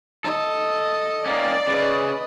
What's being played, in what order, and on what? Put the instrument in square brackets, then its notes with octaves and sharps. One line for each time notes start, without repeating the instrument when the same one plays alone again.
[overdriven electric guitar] A4 [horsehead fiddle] D#5
[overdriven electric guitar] A#3 C#4 [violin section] D5
[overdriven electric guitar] C#3 [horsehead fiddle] B4 D#5